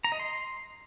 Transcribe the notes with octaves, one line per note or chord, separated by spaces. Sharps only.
A#5
D#5
C6